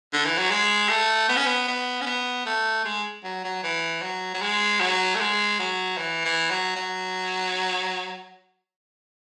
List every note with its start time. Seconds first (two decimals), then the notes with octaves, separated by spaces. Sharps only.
0.13 D3
0.25 E3
0.38 F#3
0.51 G#3
0.89 A3
1.29 B3
1.37 C#4
1.46 B3
1.68 B3
2.01 C#4
2.07 B3
2.46 A3
2.85 G#3
3.24 F#3
3.44 F#3
3.63 E3
4.02 F#3
4.34 F#3
4.42 G#3
4.80 F#3
5.15 A3
5.20 G#3
5.59 F#3
5.98 E3
6.25 E3
6.50 F#3
6.76 F#3